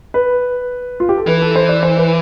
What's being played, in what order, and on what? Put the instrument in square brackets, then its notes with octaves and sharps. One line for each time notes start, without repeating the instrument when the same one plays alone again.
[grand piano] B4
F4
G4
A4
[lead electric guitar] E3 [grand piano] B4
[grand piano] A4
C5
D5
C5
B4